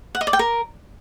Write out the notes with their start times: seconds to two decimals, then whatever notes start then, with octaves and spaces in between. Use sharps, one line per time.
0.15 F#5
0.21 D#5
0.27 D5
0.33 G5
0.39 A#4